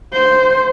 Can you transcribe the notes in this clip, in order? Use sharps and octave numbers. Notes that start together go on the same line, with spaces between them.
C5